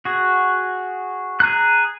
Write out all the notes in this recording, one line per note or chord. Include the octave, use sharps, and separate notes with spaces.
F#4 G#4
G#4 A#5 F#6